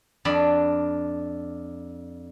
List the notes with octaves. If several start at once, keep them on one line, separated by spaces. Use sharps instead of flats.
F2 D4 B5